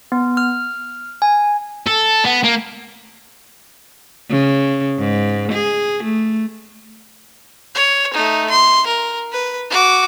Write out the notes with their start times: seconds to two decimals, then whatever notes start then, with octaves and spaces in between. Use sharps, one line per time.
0.12 B3
0.37 F6
1.22 G#5
1.87 A4
2.25 B3
2.44 A#3
4.30 C#3
4.99 G#2
5.53 G#4
6.04 A3
7.75 C#5
8.13 A3 D#4
8.50 C6
8.86 A#4
9.32 B4
9.70 F#4 D6